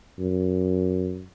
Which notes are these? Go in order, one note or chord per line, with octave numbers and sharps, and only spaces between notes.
F#2